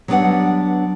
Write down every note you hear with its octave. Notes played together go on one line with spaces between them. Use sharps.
F#3 G3 B3 D4 B4 F#5